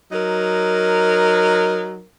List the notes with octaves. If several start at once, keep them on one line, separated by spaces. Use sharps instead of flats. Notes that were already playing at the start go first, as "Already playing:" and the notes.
F#3 D#4 A#4